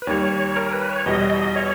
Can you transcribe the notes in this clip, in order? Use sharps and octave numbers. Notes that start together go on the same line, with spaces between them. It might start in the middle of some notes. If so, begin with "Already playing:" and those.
B4
D#2 D#3 G3 C#5
A#4
B4
C#5
E2 B2 G3 D#5
D#5
C#5